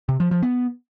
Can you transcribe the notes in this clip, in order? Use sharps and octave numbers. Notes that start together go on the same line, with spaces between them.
C3
F3
F3
B3